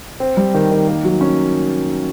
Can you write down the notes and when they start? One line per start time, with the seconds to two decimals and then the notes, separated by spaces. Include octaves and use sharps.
0.20 C4
0.37 G3
0.54 D#3
0.71 D#3
0.88 A#3
1.04 F#3
1.21 C#4